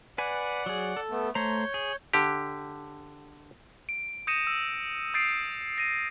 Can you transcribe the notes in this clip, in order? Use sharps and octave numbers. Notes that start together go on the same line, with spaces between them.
B4 D5 F#5 G#5
F#3 G#4
A4
A3 B3
A3 C5 C#5 A#5 G6
G#4
D3 G4
D7
D#6 G6 A#6 C#7 D#7 E7
E6
D#6 G6 A6 C7 D7
A#6 D#7